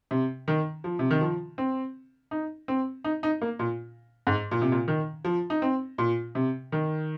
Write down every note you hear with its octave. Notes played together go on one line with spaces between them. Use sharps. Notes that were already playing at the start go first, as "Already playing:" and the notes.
C3
D#3
F3
C3
D#3
F3
C4
D#4
C4
D#4
D#4
A#3
A#2
G#2
A#2
C3
A#2
D#3
F3
D#4
C4
A#2
C3
D#3